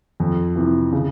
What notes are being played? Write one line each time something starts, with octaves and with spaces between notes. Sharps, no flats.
F2
C3 E3
C#3